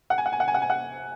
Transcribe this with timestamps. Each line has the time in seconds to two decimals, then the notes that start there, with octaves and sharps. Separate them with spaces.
0.10 F#5
0.18 G#5
0.26 F#5
0.33 G#5
0.40 F#5
0.48 G#5
0.54 F#5
0.62 G#5
0.70 F#5